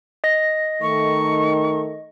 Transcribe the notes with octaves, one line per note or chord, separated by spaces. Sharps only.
D#5 A#6
D#3 A3 C#6